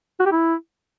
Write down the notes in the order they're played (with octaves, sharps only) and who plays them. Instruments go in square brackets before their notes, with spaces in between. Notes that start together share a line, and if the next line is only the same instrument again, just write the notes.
[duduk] F#4
G4
E4